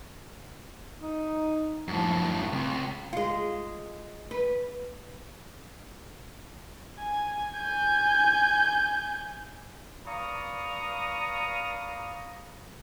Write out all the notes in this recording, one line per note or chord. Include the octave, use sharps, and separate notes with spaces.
D#4
F#2 A2 F3
C#2 C4
G#3 F4
B4
G#5
G#5 G6
B4 D5 F5 A#5 C#6 D#6